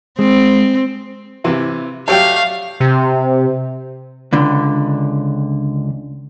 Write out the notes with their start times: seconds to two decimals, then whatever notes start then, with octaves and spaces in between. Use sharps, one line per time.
0.19 G#3 C4
1.44 C3 E3
2.08 F#3 A3 G4 C#5 D5 F5 G5
2.80 C3
4.33 C#2 D3